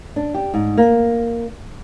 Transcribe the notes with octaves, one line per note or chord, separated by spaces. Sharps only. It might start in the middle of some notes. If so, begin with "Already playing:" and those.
D4
G4
G#2
A#3